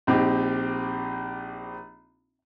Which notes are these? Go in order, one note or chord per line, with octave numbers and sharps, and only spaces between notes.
A#1 C4 D#4 G4